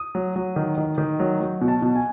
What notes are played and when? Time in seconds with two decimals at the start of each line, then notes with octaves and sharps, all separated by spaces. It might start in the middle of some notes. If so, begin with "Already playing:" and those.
Already playing: D#6
0.15 F#3
0.36 F#3
0.56 D#3
0.77 D#3
0.98 D#3
1.20 F#3
1.40 F#3
1.61 B2
1.68 A5
1.82 B2
1.96 G#5